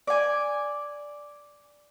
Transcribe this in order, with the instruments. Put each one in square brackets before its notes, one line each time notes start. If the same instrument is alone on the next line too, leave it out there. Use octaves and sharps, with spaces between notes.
[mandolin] D5 G#5